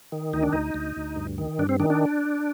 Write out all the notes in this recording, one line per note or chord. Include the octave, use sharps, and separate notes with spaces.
D#3
D2 D#4
D4
D2 D#4
D2
D2
G2
D#3
G2 D4
C4
D#3 D4
D4